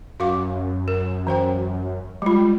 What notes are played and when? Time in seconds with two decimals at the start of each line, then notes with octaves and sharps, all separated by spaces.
0.20 F#2 F#4 F5 D6
0.88 A#4
1.27 E3 C5 G5
2.22 G3 G#3 F4